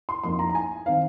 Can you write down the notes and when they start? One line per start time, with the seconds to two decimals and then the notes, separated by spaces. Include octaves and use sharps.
0.09 C6
0.23 F2 F3 A#3 D#4 C6
0.39 A#5
0.50 A#5
0.55 G#5
0.86 D#3 C4 D#4 F5